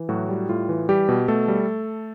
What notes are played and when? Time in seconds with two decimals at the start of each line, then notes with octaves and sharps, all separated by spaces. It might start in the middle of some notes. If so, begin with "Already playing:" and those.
Already playing: E3
0.09 A2 F#3 F#4
0.29 G3
0.49 A2 F4
0.69 E3
0.89 G3 G4
1.09 B2
1.28 B2 A3 A4
1.48 G3